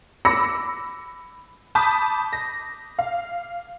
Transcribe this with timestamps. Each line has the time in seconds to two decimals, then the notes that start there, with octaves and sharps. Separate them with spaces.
0.25 B5 D6 E6 A#6 C#7
1.75 A5 B5 D6 D#6 G6 B6
2.33 A#6
2.99 F5